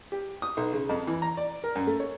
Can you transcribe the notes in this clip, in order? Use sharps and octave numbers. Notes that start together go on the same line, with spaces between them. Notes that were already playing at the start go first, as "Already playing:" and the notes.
G4
D#6
B1
C#3
F2
E3
A#5
D5
A#4
F#2
A3
C#5